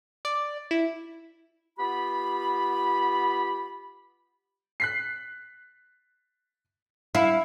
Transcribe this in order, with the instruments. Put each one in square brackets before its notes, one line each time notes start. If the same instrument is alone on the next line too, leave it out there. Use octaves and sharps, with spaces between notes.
[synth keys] D5
E4
[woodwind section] B3 F4 G4 B5
[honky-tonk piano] F#6 B6 C7
[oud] E4 [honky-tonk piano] F5